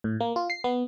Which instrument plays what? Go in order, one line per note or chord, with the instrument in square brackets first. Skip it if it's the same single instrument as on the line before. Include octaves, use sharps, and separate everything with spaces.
[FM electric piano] A2
A#3
F4
C7
B3